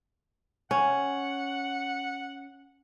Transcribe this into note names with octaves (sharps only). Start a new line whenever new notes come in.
C#4 F#5